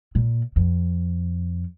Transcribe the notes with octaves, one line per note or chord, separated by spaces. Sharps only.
A#2
F2